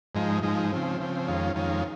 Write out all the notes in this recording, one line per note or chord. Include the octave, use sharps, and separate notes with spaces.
G#2 F3 G#3 D#4
G#2 F3 G#3 D#4
C#3 F3 C4
C#3 F3 C4
F2 D#3 G#3 C#4 F4
F2 D#3 G#3 C#4 F4